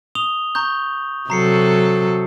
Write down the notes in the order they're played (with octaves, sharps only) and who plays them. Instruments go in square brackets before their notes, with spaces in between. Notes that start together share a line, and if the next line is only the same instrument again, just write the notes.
[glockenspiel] D#6 F7 G7
A#5 C#6 G6
[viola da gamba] C3 F#3 A4 [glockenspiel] A#5 C7 C#7